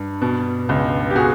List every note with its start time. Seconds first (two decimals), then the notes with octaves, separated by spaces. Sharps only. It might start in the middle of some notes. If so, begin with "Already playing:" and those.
Already playing: G2
0.22 B2
0.69 C#2
1.10 G4
1.15 B2 F#4 G#4